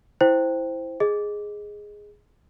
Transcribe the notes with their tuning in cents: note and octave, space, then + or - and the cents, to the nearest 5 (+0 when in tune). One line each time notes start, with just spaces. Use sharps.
E4 +0 C5 +0 G5 +0
G#4 +0 D#5 +0